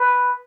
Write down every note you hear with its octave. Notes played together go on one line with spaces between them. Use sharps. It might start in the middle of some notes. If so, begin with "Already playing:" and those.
Already playing: B4